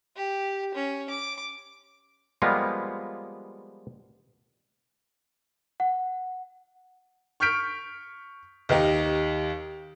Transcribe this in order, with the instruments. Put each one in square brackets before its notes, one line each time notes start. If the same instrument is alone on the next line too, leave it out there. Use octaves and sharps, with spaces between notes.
[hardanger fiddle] G4
C#4
D6
[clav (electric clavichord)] F3 G3 G#3 A#3 B3 F4
[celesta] F#5
[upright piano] C#6 F6 G6 B6 D7
D#2 D#4 G4